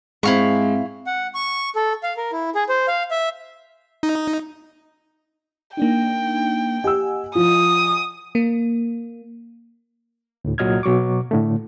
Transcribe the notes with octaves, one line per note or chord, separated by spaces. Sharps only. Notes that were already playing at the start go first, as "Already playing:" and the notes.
G#2 G#3 C4 E4 F5 C#6
F#5
C#6
A4
F5
A#4
E4
G#4
C5
F5
E5
D#4
A#3 D4 D#4 G5
G4 D#5 F#5 G#5 E6
F3 F4 D#6
A#3
D2 A2
C2 A#2 F#3 D#5 F6 G#6
B2 F#3 C#6 D6
A2 D3 A3